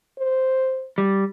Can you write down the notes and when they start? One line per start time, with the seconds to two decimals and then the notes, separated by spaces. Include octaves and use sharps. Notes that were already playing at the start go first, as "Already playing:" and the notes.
0.19 C5
0.98 G3